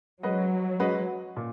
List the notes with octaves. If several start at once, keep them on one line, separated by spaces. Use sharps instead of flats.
F#3 G#3 C#4 F#4 B4 D#5
G#3 C#4 F#4 B4 D#5
A#2